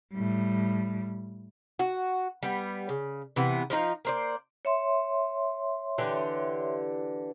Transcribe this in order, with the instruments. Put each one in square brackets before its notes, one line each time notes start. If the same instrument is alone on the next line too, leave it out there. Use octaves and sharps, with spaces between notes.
[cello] A2 G3
[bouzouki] F#4
G3 B3
C#3
C3 E3 B3
F3 D4 D#4 F4
A#3 C5 D5
[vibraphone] C#5 E5 C6
[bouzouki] D3 E3 G4